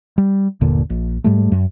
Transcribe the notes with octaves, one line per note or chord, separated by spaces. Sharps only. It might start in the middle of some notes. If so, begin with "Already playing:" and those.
G3
G1 D#2 A#2 D3
A#1
G#2 G3 A3
F#2